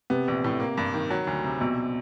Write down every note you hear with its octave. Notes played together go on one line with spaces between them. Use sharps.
C3 B3
A#1
A2
A#3
G2
D#3
F#3
D2
C3
A#1 B2